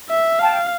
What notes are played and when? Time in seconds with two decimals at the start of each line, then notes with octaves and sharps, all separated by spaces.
0.10 E5
0.39 F5 G5 A5